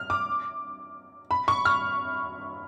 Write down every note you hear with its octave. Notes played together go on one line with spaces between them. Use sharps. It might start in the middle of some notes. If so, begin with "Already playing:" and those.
Already playing: F6
D6
B5
C#6
F6